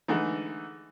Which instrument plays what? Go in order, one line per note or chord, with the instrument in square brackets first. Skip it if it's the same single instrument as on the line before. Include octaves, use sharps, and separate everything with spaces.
[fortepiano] D3 E3 G#3 A3 D#4